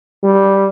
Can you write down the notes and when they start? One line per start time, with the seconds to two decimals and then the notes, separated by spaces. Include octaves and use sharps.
0.23 G3